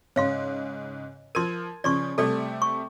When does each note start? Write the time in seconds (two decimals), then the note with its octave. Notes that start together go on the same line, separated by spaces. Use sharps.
0.16 G#2 C#3 C#5 F5 C6
1.35 F3 A#4 C6 G#6 D#7
1.84 C#3 F3 D5 C6 C#6
2.18 C3 G3 A3 A4 D5
2.62 C#6